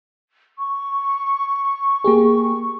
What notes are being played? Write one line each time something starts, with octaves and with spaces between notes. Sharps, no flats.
C#6
A#3 G4 G#4